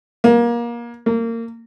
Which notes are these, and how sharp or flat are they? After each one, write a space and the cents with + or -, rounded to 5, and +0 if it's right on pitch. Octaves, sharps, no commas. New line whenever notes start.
A#3 +25
A#3 -25